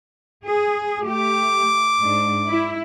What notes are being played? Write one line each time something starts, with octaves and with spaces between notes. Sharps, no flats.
G#4
A3 G4 D6
G#2 D4
E4